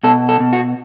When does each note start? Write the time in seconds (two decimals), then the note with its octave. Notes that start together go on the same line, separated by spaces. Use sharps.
0.03 B2 A4
0.29 A4
0.40 B2
0.53 F#4